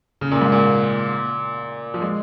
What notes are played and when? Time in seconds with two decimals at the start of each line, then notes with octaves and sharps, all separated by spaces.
0.21 C#3
0.32 A#2
0.42 G#2
0.52 A#2
1.94 F3
2.02 G#3